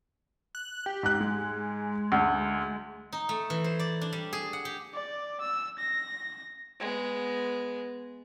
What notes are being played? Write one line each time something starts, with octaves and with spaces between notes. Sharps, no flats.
F#6
G4
G#2 F#6
G#3
D2
D#4
A3
E3
C5
D5
D4
G3
G#4
F#5
G4
D5
E6
A#6
G#3 B3